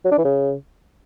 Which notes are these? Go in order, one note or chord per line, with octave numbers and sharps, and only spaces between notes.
F#3
D4
E3
C#3